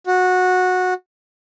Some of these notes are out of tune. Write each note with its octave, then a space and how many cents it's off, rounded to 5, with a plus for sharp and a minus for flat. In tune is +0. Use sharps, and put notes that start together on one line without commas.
F#4 -15